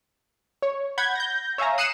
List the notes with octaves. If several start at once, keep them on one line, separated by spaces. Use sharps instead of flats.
C#5
F#5 B5 G6 G#6
G6 A#6
C#5 E5 F5 G#5 A#5
D#6 F#6 C7 C#7 D#7 E7